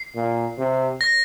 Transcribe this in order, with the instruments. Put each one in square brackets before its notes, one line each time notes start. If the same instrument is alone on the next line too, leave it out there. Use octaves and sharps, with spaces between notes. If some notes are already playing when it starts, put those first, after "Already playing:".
Already playing: [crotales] C7
[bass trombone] A#2
C3
[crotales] A#6